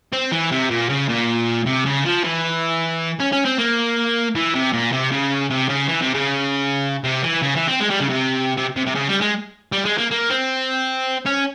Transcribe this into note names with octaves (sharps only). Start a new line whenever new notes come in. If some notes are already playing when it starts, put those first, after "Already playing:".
C4
E3
C3
A#2
C#3
A#2
C3
C#3
F3
E3
C#4
C#4
C4
A#3
E3
C3
A#2
C3
C#3
C3
C#3
E3
C3
C#3
C3
E3
C#3
E3
C4
G#3
G3
C#3
C3
C3
C3
C3
C#3
G3
G#3
G3
G#3
A#3
A#3
C4
C#4